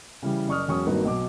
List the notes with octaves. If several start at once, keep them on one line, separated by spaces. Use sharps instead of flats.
C#3 E3 G3
F#1 D5 C#6 D#6 F6
E1 F#3 C#4 C#6 D#6
G#1 G2 A#3 D#4 F#4 B4
B1 B2 F#3 D6